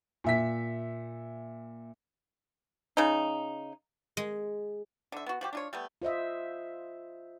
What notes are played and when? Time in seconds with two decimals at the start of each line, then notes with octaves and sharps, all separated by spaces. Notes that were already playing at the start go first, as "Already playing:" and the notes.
0.24 A#2 E5 B6
2.97 C#3 D#4
4.17 G#3
5.12 D3 E5
5.26 B3 F#4
5.41 F3 F#4 G4
5.53 D4 F4 C#5
5.73 G3 A3 B3
6.02 F4 C5 D#5 E5